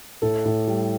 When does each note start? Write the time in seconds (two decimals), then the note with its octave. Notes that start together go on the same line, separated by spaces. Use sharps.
0.22 A2 A4
0.45 A2
0.67 G3